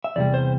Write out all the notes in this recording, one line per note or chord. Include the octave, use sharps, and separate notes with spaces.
E5
E2 C3 G3 D5
C5